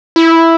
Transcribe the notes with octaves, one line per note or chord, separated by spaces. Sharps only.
E4